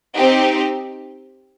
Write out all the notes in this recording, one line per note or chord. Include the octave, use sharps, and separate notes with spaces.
C4 D#4 G4